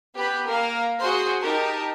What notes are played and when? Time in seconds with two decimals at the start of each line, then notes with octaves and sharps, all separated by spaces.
0.15 B3 G4 B4 B5
0.47 A#3 A#4 F5
0.99 F#4 G#4 C5 C6
1.40 D#4 G4 A#4 A5